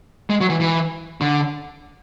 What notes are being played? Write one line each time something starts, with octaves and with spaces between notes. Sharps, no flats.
G#3
F#3
E3
E3
D3